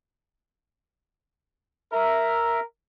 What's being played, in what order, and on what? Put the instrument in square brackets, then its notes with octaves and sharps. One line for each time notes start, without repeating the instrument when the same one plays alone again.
[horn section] A#4 [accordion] E5